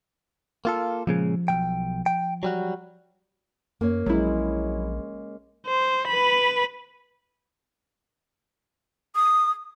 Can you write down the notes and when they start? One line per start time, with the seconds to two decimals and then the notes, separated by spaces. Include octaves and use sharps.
0.65 A#3 F4 A4
1.07 A#2 C#3 F3 G#3
1.48 B1 E3 G5
2.06 G5
2.43 F#3 G3 F#4
3.81 F#2 A#3 C#5
4.06 A#1 F#3 G#3 C#4 E4
5.67 C5
6.08 B4 B5
9.16 D#6